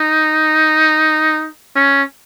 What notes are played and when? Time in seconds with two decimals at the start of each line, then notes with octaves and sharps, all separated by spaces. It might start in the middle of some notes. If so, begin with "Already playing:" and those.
Already playing: D#4
1.75 C#4